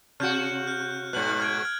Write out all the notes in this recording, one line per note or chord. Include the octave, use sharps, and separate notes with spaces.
C3 F#4 F6 G6
F6 F#6
G#2 B2 F#6 F#7
F6 G#6 D7
F6